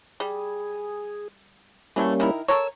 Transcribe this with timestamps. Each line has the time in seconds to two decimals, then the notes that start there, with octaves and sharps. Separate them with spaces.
0.20 G3 G#4
1.96 E3 F#3 G3 A3 A#3 C#4
2.20 D#3 E4 A#4
2.48 A4 A#4 C#5 E6